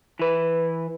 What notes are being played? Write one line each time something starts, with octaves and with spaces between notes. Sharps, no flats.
E3 B4